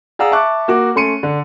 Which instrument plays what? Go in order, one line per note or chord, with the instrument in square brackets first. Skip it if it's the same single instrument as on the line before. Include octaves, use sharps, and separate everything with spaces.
[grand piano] G#4 D5 F5 F#5 A#5 E6
E5 A5 C#6 D6 F#6
A#3 F#4 D6
A3 C#4 C6 C#7 D#7
D3